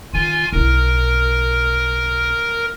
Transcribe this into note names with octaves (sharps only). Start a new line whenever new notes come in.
D#3 F4 G#5
B1 E4 A#4